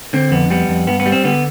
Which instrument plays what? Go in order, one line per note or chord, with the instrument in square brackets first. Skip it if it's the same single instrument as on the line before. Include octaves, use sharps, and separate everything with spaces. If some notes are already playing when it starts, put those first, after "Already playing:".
[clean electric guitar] D3 C4
F2 B3
G3 B3
F2
G2 B3
B3
G3
C4
D3 B3